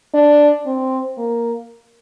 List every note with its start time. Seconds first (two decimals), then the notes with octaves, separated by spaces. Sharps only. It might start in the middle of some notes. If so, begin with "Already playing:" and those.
0.14 D4
0.66 C4
1.18 A#3